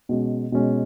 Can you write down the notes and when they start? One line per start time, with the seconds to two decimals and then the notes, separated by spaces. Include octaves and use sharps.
0.09 B2 G#3 C#4
0.52 B2 G#3 C#4